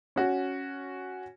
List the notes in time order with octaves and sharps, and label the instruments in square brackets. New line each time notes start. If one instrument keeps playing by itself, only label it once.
[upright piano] C#4 F#4